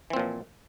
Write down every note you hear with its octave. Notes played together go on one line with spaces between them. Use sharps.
A#2 E3 F3 C4